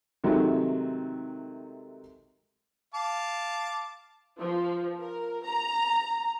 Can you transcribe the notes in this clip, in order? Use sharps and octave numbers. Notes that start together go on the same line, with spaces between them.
C3 D#3 F#3 G#3 A3
F5 A5 D6
F3
A#4
A#5